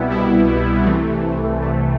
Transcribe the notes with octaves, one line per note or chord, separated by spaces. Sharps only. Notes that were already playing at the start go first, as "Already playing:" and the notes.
Already playing: C2 B2 G3 B3 E4
C2 B2 G3 B3 E4
C2 C3 E3 A3
C2 C3 E3 A3